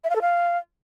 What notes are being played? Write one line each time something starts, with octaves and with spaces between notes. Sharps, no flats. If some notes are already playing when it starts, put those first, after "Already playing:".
E5
F5
A4
F5